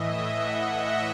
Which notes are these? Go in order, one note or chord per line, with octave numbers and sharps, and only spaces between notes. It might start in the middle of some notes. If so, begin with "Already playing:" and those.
Already playing: A2 E3 D#5 E5
F#5
E5